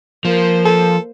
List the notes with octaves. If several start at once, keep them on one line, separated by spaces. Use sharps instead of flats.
F3 A#3 C5
A4